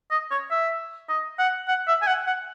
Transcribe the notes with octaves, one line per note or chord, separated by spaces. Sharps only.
D#5
C#5
E5
D#5
F#5
F#5
E5
G#5
F#5
F#5